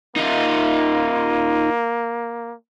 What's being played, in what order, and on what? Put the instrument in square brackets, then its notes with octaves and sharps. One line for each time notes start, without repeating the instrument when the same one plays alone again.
[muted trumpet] A#3 [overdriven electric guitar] D#4 F4